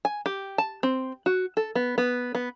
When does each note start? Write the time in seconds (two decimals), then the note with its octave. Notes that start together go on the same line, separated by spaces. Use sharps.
0.05 G#5
0.26 G4
0.58 A5
0.83 C4
1.26 F#4
1.57 A4
1.75 B3
1.98 B3
2.35 B3